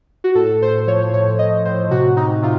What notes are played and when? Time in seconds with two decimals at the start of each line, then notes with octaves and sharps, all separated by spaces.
0.24 F#4
0.35 A2 A4
0.62 A2 C5
0.87 F3 C#5
1.13 A2 C#5
1.39 A2 D#5
1.65 A2 C5
1.90 C3 F#4
2.17 C3 D#4
2.42 C3 F4